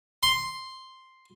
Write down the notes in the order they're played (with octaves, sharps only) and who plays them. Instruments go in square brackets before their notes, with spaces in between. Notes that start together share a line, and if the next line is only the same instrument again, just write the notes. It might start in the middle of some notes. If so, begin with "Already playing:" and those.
[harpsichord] C6